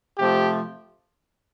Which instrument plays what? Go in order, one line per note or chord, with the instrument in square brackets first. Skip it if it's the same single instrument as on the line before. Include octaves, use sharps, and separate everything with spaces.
[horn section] C3 F3 A3 G4